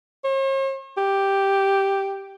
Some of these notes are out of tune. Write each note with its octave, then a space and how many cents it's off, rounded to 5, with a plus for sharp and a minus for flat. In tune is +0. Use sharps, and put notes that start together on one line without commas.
C#5 -45
G4 +0